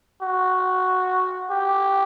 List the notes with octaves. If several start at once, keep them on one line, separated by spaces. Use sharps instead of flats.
F#4
G4